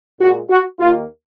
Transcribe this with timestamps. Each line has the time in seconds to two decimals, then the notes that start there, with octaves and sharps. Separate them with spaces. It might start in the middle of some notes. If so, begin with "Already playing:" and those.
0.20 A#2 G#3 F#4
0.50 F#4
0.80 D#2 D#3 A#3 F4